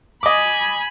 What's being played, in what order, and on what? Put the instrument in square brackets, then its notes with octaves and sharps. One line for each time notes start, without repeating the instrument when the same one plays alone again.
[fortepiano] D#5 D6 [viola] G#5 B5